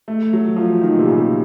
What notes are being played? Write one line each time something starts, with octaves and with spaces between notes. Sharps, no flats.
A3
F#3
F3
D#3
A#2
C3
C#3